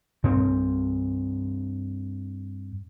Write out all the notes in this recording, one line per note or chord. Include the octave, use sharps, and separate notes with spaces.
G2 C4